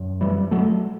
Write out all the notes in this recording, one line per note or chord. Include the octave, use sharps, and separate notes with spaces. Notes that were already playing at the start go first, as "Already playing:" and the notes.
Already playing: F#2
E3 G3
F#3 A3